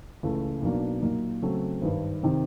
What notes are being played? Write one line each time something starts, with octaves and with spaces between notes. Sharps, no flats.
C#2 C#3 E3 A3
B1 B2 F#3 A#3 D4
A#2 F#3 A#3 D#4
C#3 F#3 A3 C4
G#1 G2 D#3
C3 D#3